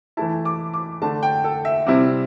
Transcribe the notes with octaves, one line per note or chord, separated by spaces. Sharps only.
E3 A3 E4 A5
D6
D6
D3 A3 D4 A5
G5
A4
E5
C3 G3 C4 E4